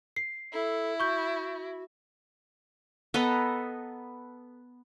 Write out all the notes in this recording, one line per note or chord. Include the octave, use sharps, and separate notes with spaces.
C7
E4 A4
F#4 C#6 G6
B3 A4 D#5 A#5